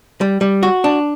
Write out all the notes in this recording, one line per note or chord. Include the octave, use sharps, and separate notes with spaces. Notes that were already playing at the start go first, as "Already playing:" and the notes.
G3
G3
F#4
D4